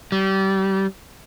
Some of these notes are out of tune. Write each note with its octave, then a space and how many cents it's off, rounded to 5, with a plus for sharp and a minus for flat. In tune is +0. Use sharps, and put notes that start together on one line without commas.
G3 -25